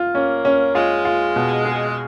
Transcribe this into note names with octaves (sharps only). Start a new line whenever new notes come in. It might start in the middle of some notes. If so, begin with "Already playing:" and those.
Already playing: F4
A#3 C#4
C#4
G#3 F4
F4
B2
G#4